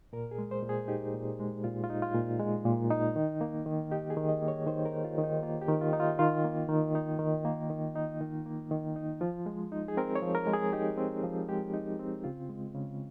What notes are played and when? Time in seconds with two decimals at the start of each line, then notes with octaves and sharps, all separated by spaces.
0.13 A#2 A#4
0.31 G#4
0.38 G#3
0.51 C5
0.63 A#2
0.69 G#4
0.88 D#4 G4
1.14 A#2
1.40 G#3
1.64 A#2 F4
1.84 F4
1.90 D#4
2.02 F4
2.14 A#2
2.40 G#3
2.65 A#2
2.90 D#4
3.16 D#3
3.41 A#3
3.66 D#3
3.91 D#4 G4
4.10 G#4
4.17 D#3
4.29 D#5
4.42 A#3
4.48 C#5
4.67 D#3 C5
4.85 A#4
4.92 D#4
5.04 F4
5.18 D#3
5.23 D#4
5.43 A#3 F4
5.61 G4
5.68 D#3
5.81 F4
5.93 D#4
6.00 F4
6.19 D#3 F4
6.44 A#3
6.69 D#3
6.95 D#4
7.19 D#3
7.45 A#3
7.70 D#3
7.95 D#4
8.21 D#3
8.46 A#3
8.71 D#3
8.96 D#4
9.21 F3 F4
9.46 G#3
9.72 D#4
9.88 G#4
9.97 C4 A#4
10.16 C#5
10.22 F3
10.35 A#4
10.47 G#3
10.53 G#4
10.73 D#4 G4
10.98 C4
11.24 F3
11.48 G#3 G4
11.73 D#4
11.99 C4
12.24 C#3 F4
12.49 G#3
12.75 C#3